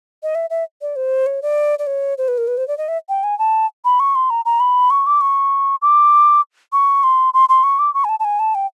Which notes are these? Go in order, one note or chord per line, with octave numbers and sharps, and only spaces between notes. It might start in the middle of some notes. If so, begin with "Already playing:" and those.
D#5
E5
E5
D5
C5
C#5
D5
D5
C#5
C5
B4
A#4
B4
C5
D5
D#5
E5
G5
G#5
A5
B5
C#6
C6
A#5
A#5
B5
C#6
D6
C#6
D6
C#6
C6
C6
C6
C#6
D6
C#6
G#5
A5
A5
G#5
A5
G5